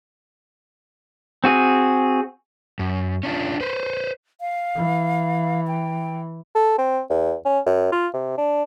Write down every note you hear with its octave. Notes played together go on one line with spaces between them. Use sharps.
C4 F#4 G#4
F#2
C#4 D4 F4
B4 C5
F5
E3
G5
A4
C4
E2
C#4
F#2
F4
C3
D4